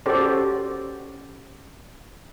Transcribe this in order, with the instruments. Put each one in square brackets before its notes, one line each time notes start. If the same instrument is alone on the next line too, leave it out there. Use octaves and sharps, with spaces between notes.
[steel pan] C#4 F#4 G4 A4 C5 D5